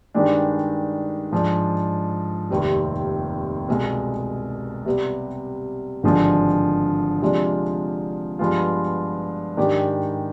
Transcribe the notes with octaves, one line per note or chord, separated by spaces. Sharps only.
G2 D#3 G#3 D4 G4
G#2 F3 G#3 D4
F1 D#2 D#3 G3 C4
C2 B2 G#3
C3 G3 B3
G#1 G2 D3 F3 G#3
C3 F3 G#3 D4 F4
G2 F3 G#3 B3 F4
G#2 D#3 G#3 D4 G4